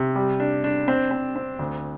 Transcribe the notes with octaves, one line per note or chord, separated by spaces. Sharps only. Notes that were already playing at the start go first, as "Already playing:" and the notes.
Already playing: C3
G3
D4
D4
C4
C4
C4
D2